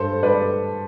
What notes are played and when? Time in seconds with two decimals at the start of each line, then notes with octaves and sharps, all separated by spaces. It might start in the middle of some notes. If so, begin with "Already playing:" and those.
Already playing: G2 A4 C5
0.23 G2 B4 D5